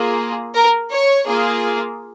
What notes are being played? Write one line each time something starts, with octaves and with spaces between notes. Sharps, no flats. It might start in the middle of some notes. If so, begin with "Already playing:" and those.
Already playing: A#3 F4 G#4
A#4
C#5
A#3 F4 G#4